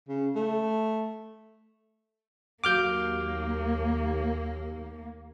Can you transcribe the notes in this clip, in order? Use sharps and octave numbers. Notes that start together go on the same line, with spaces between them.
C#3
A3
D#2 F#3 A#3 F5 D6 F6 G6